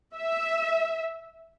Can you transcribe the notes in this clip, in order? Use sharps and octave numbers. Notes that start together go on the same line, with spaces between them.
E5